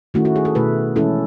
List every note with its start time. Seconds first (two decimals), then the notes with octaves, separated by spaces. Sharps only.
0.14 D#3 A3 C#4 E4 F#4
0.25 F#4
0.36 G#4
0.45 A4
0.55 B2 A3 E4 B4
0.96 E3 G#3 C#4 E4 A4